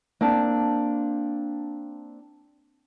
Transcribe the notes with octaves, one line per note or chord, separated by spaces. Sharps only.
A#3 C4 D4